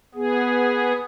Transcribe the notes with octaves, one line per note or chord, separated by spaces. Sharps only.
B3 G#4